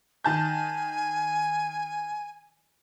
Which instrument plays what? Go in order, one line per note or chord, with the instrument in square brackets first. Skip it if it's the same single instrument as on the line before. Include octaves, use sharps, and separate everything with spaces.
[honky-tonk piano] D#3 A5 G6 [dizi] G#5